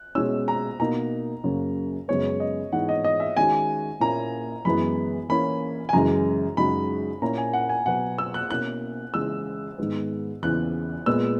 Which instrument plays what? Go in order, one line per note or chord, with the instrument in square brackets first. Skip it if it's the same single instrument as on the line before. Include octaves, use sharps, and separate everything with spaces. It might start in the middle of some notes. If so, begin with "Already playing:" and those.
Already playing: [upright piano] F#6
[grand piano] B2 G#3 C#4 [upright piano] E6
[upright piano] A#5
[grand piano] B2 A#3 D#4 [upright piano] A#5
[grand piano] F#2 C#3 F#3 A#3 C#4
[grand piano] F#2 C#3 G#3 B3 [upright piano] C#5
[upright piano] D#5
[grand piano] G#2 E3 G#3 B3 D#4 [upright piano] F#5
[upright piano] D#5
D#5
E5
[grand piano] D#3 G#3 C#4 F#4 [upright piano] G#5
[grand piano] A#2 A#3 C#4 E4 [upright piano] A#5
[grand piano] F#2 E3 G#3 B3 [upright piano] B5
[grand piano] E3 A#3 C#4 [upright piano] B5
[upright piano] G#5
[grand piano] F#2 C#3 E3 G#3 [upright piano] A#5
[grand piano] F#2 C#3 G#3 D#4 F#4 [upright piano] B5
[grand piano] A#2 A#3 C#4 E4 [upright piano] A#5
[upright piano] G#5
F#5
G#5
[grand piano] B2 F#3 B3 F#4 [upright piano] F#5
[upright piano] E6
F#6
[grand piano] B2 A#3 C#4 E4 [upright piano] F#6
[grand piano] C#3 E3 G#3 [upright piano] E6
[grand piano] G#2 D#3 G#3 B3
[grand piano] E2 C#3 E3 [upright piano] F#6
[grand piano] A#2 G#3 B3 [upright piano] E6